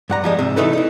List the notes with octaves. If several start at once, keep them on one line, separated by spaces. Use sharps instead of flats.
G2 F#5 A#5
F3 G3 G#3
G#2 C3
E3 A3 D#4 A4 B4
D#4 E4